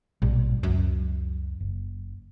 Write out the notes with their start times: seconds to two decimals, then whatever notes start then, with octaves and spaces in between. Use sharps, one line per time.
0.22 A#1 G#2 B2 G3
0.63 C#2 F#2
1.60 F#1